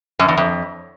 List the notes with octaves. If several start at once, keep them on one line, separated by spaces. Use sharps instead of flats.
F#2
E2
F2